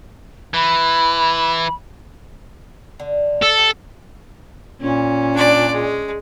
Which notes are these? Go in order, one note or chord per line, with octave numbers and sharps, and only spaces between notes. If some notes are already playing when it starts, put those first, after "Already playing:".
E3 B5
D3
A4
G4
A#2 C#4
D4 D5
G#3